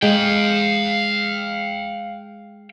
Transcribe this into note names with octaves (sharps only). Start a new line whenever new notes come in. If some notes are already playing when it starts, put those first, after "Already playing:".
G#3 F5 G5